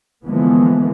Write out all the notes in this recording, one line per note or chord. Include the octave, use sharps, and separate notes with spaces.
D3 E3 F3 G#3 A#3 B3